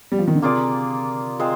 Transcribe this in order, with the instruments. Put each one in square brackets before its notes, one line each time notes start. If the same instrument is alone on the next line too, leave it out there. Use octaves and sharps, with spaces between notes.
[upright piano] G3
F3
D#3
D3
[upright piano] C3 [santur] A#3 F4 G#4 D5
[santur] G#3 C4 F4 C5